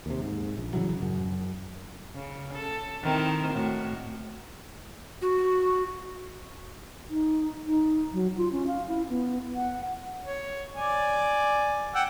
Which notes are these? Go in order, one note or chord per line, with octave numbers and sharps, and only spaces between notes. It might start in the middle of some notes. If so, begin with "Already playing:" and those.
D#2 C3
G#2
A#1
A2 C#3 E3 F#3
F#2
C#3
A4
D#3 C4 E4
A2 F#4
F#4
D#4
D#4
F#3
F4
C#4
F5
E4
B3
F#5
C#5
D5 G#5
F#5 G5 E6